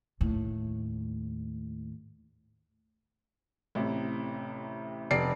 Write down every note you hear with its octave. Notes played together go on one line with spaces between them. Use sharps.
D#2 A2
A1 C3 E4
F1 D5 C7